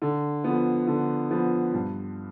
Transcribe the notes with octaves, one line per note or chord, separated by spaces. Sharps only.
D3
F3 B3
D3
F3 B3
G2